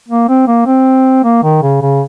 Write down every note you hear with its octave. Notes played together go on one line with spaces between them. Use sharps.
A#3
C4
A#3
C4
A#3
D#3
C#3
C#3